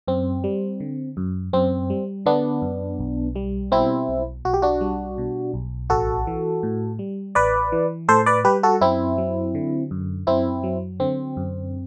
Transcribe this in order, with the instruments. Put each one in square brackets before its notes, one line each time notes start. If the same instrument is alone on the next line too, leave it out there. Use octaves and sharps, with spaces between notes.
[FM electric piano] F#2 C4
G3
D3
F#2
F#2 C4
G3
D3 B3 D4
F#2
B1
G3
B2 C4 E4
B1
B1 F#4
G4
D4 F#4
G3
B2
B1
A1 F#4 A4
E3
A2
G3
A1 B4 D5
E3
A2 A4 C5
B4 D5
G3 G4 B4
F#4 A4
F#2 C4 E4
F#3
D3
F#2
F#2 C4 E4
F#3
D3 C4
F#2